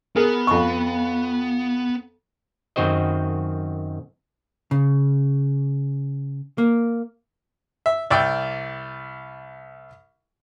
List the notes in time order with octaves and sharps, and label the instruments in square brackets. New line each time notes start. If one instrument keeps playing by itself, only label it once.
[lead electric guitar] B3 [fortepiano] G#4 A#4
[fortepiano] F2 C#6
[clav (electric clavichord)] F#2 D#3 C4 F#4 C5 D#5
[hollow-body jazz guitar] C#3
A#3
[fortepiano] E5
C2 D5 G5 E6